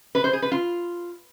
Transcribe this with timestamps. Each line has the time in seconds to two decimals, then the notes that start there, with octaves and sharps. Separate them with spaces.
0.15 B4
0.24 C5
0.33 G#4
0.42 B4
0.52 F4